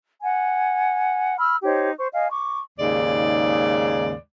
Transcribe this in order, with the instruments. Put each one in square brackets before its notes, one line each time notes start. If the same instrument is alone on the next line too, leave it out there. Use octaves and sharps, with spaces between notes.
[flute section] F#5 G#5
B5 E6 F6
D#4 G4 C5 C#5
C5 C#6
D#5 F5 G#5
C#6 D6
[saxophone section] D#2 G#2 C#3 G#3 D5